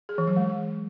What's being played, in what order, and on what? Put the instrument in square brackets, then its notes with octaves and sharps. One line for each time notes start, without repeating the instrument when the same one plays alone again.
[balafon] G#4
E3
F#3
G#3